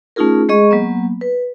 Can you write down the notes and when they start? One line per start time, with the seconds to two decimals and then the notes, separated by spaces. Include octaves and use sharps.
0.16 A3 C#4 D#4 F4 G#4 A#4
0.49 G#3 G#4 D#5 C#6
0.71 F#3 A#3 B3
1.21 B4